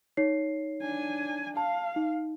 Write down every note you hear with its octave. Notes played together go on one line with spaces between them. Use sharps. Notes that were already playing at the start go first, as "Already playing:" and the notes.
D#4 C#5 C7
D4 G#5
F5 A5
D#4